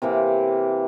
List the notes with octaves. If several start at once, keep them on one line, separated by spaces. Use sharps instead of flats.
C3 E3 A#3 C4